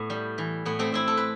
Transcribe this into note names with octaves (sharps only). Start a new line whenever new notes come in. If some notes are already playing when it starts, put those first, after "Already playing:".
Already playing: A2 A3 B3
G3
E3
A2 B3
A3 C4
A2 C4 E4
A4
B4